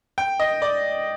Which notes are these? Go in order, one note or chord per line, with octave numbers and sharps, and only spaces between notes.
G5
D#5
D5